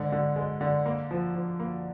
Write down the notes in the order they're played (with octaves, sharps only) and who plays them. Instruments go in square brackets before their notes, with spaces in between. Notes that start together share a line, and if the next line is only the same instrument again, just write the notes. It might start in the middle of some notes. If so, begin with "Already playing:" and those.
Already playing: [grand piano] G#2 D3
D3
G#3
D3
A#3
F3
F3
A#3